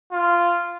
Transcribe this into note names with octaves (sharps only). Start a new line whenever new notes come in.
F4